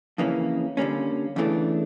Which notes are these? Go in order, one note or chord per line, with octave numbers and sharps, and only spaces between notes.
F2 C#3 E3 A#3 C#4
D3 G3 A#3 C#4
E2 C#3 E3 A3 D4